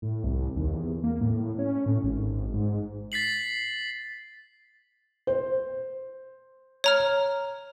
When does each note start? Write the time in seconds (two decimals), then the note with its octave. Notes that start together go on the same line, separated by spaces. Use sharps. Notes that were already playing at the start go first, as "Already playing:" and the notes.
0.02 A2
0.24 C2
0.56 D#2
0.73 E2
1.04 A#3
1.21 A2
1.59 C#4
1.86 A2
2.04 G#1
2.54 G#2
3.12 A6 B6 C7 F#7
5.27 C5
6.84 C#5 A#5 F6